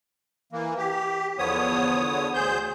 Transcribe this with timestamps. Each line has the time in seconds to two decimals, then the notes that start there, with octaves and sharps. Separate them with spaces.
0.52 E3 A#3
0.78 G4
1.38 E2 D3 F3 B3 C#5 D#6
2.34 D2 G#4 C5 G6